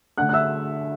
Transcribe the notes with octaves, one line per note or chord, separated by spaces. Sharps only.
D3 A3 D4 F#5 F#6
F#6
E5 E6